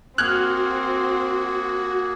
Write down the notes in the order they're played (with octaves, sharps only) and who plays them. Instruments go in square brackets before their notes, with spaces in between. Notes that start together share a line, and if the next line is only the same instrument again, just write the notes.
[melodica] A#3 G#4 [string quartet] C4 [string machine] F#4 [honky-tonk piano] F6 F#6 G#6